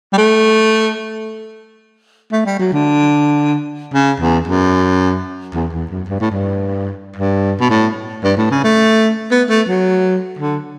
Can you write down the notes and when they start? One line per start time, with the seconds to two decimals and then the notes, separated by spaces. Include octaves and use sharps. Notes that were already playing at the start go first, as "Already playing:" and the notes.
0.13 G3
0.18 A3
2.32 A3
2.45 G3
2.59 F#3
2.73 D3
3.94 C#3
4.20 E2
4.47 F#2
5.54 E2
5.73 E2
5.90 F#2
6.09 G2
6.20 A2
6.31 G2
7.16 G2
7.60 B2
7.70 A2
8.24 G2
8.37 A2
8.51 C#3
8.64 A3
9.31 B3
9.49 A3
9.68 F#3
10.39 D3